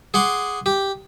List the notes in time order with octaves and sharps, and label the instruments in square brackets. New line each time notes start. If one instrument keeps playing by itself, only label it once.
[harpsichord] G#4 F#5 C6 D6
G4